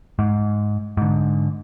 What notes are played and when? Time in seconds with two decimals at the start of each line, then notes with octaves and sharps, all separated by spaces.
0.19 G#2
0.97 G#2 D3